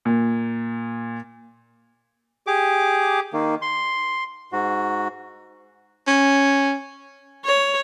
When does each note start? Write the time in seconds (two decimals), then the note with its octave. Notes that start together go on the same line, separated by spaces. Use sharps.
0.05 A#2
2.47 G4 G#4 D6
3.33 D#3 A#3
3.62 C6
4.52 G#2 F#4
6.07 C#4
7.45 C#5